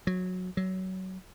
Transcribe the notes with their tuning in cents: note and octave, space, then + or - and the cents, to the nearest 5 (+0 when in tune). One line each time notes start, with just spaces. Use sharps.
F#3 -15
F#3 +20